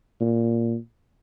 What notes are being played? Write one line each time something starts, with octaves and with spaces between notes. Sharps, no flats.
A#2